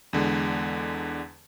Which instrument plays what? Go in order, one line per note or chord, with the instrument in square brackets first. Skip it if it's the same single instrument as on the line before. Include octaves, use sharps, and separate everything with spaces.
[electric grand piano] E2 D3 G#3